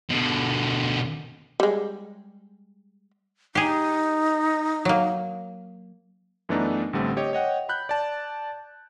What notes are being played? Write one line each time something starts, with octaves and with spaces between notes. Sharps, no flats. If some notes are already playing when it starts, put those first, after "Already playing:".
B2 D3
G3 G#3
D#4 G4 G#4
F#3 A#3
F#2 E3 A3 B3 D4 D#4
A1 D3 G3 A3 C4
G4 C#5 D#5
C#5 D#5 F#5 G5
B5 F#6 G6
D5 A5